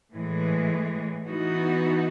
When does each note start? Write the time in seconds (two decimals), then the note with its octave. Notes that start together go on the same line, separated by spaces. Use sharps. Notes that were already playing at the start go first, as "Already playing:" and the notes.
0.12 A2 E3 G#3
1.27 E3 B3 D#4 F#4